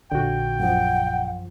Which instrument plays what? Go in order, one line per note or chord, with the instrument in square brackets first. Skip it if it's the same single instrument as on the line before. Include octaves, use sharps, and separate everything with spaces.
[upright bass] A#1 [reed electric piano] D3 F#4 [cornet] G5
[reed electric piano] F#2 F3 [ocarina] F#5